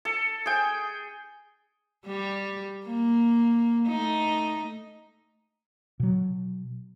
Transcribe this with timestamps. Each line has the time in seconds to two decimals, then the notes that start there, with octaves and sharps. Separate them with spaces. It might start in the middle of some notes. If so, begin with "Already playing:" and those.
0.05 A4
0.46 G#4 G5
2.07 G3 G4
2.86 A#3
3.87 A3 D#4
6.00 B2 F#3